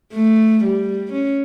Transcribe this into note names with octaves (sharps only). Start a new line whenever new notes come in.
A3
G3
C#4